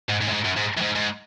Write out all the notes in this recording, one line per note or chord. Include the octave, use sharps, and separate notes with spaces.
G#2
G#2
F#2
G#2
F#2
G#2
F#2
G#2
G#2